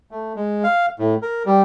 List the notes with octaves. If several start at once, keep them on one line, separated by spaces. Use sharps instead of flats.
A3
G#3
F5
A2
A#4
G3